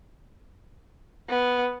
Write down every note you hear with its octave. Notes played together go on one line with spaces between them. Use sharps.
B3